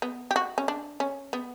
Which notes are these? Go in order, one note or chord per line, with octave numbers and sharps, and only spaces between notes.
B3
G4
F#4
C#4
D4
C#4
B3